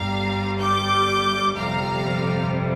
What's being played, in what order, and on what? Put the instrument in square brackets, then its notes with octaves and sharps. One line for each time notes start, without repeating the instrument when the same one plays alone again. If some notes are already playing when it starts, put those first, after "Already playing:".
Already playing: [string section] G1 G2 G3 F5 A#5
D6 G6
G1 F2 C3 G3 F5 A#5